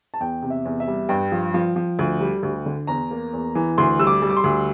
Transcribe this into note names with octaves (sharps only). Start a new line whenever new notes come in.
A5
E2 G5
C3
E5
E2
E5
G3
G2 G5
F3
F3
F3
D2
G3
D2
D3
E2 A#5
A#3
E2
E3
D2 C6
G3 E6
D6
G3
D6
C6
D2